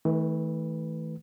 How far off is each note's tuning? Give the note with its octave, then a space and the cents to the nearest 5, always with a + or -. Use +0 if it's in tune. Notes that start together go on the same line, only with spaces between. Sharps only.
E3 -45 A3 +0 B4 +0